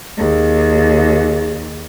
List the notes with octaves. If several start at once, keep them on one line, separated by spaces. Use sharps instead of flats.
D#2 G#4